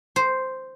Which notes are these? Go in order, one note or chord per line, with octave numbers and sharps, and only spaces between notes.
C5